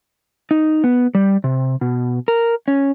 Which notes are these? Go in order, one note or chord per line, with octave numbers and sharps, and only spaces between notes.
D#4
B3
G3
C3
B2
A#4
C#4